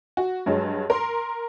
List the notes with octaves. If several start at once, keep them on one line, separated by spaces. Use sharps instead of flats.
F#4
G2 F#3 G#3
A#4 C6